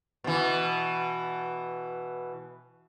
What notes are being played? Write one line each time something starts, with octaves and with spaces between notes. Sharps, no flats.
B2 E3